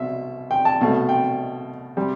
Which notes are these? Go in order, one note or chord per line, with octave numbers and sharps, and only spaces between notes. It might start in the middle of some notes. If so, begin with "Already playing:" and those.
Already playing: C2 B2 E5
G5
A5
C2 B2 A3
G5
C3 G3